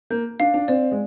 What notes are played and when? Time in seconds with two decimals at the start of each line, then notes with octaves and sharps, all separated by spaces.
0.10 A#3 G6
0.40 D4 F5
0.54 D4
0.68 C4 D5
0.92 G#3